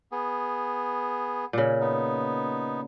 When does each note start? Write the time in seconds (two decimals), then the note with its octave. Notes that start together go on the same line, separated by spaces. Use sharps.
0.12 B3 G#4
1.53 A#2 C#3
1.81 B3 D#4